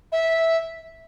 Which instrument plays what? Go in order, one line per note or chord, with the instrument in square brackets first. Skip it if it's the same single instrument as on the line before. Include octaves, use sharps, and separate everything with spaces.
[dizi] E5